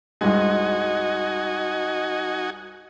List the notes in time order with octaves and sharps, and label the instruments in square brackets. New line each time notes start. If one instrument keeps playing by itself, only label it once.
[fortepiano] C2 G2 G#3 [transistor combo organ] D#4 F#4 G#5 [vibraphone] D#5